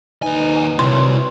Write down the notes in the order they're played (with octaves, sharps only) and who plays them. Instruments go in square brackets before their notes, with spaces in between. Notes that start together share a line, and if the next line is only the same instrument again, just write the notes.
[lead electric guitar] D#2 G#5 [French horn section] D#4 B4
[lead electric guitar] C3 E4 [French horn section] F#3 B4 C#5 [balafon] C6